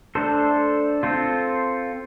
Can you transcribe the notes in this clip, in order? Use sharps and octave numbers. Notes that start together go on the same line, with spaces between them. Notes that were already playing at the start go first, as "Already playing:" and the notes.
A3 D4 A4 C5
C4 F4 A4 C5